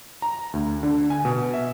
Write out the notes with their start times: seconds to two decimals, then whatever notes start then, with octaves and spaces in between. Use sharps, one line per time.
0.22 A#5
0.53 D2
0.83 D3
1.10 G#5
1.25 B2
1.54 E5